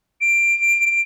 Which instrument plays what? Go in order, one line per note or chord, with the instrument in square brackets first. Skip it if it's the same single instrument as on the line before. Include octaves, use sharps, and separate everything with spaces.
[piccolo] D7